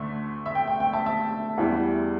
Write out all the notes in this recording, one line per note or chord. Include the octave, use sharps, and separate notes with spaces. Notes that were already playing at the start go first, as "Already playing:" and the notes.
Already playing: D2 D3 A3 E5
E5
G5
G5
G5
E5 A5
E5 A5
E2 E3 G3